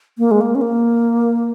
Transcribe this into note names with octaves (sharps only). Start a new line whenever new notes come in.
A#3
G#3
A#3
C#4
A#3